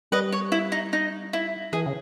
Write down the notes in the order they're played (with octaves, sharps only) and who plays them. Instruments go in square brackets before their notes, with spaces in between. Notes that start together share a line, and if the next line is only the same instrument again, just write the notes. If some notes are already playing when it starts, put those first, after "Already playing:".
[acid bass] G3 [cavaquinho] B4 D#5
[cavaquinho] C#5
E4
D#4
D#4
E4
[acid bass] E3 [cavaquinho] G#4
[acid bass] C#3